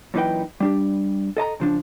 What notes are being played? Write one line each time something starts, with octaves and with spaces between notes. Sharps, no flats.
F#2 A#2 E3 D#4 B4 G5
G3 D4 G4
A4 D#5 A5 A#5
C#3 F3 D4